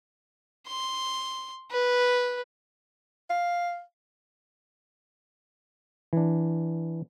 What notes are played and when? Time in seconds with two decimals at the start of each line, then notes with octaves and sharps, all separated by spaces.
0.67 C6
1.71 B4
3.30 F5
6.13 E3 D4